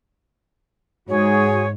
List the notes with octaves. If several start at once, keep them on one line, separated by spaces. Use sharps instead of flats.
G#2 F#4 G#4 C#5